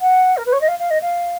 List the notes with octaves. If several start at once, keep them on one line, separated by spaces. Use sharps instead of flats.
F#5
A#4
B4
C#5
D#5
F5
F5
D#5
F5